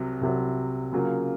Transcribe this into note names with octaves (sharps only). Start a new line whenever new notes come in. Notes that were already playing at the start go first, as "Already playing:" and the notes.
Already playing: C2 C3 F#3
C2 C3 F#3
C#3 F#3 A#3 F4